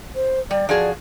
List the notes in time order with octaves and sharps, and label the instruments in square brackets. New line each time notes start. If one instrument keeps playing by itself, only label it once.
[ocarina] C5
[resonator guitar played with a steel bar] G3 [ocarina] D5
[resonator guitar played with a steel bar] F3 F#4 G#4 [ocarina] D5